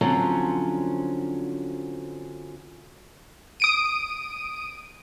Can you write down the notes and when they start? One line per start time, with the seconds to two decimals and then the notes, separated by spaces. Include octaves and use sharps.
0.01 D3 F3 F#3 C4 C#4
3.60 D#6 D7 D#7